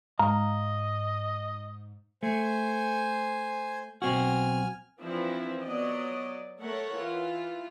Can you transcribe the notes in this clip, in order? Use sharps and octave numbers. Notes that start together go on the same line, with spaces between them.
G#2 D#5 F5 A#5
A3 C5 G#5
B1 C4 F#4 G#5 F6
E3 F3 C4 D4 E4
F#3 B3 D5 D#5
A3 A4 A#4 C#5 F#5
E3 F4